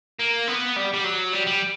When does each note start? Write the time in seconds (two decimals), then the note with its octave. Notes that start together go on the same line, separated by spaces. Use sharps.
0.20 A#3
0.48 B3
0.76 G3
0.94 G3
1.04 F#3
1.33 G3
1.47 G3